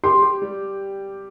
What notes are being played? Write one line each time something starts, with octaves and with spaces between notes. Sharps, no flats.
G4 C6
G4
G3